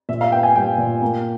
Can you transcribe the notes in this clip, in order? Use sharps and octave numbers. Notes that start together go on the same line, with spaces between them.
A#2 E5
F5
B3 G5
G#5
G3 G5
A#2
A#3